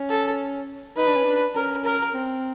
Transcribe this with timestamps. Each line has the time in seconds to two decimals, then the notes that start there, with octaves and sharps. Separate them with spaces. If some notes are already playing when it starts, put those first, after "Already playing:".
Already playing: C#4
0.09 A4
0.97 D#4 B4
1.07 D4
1.17 C#4
1.25 D4
1.55 C#4 A#4
1.85 A#4
2.13 C4